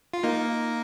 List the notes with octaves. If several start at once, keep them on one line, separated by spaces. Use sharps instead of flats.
F4
A#3 D#4